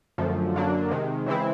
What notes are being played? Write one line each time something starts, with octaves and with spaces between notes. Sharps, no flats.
F#2 D3 F3 A3
F#2 D3 F#3 A#3 D4
C3 D#3 G#3
C#3 E3 G#3 C4 E4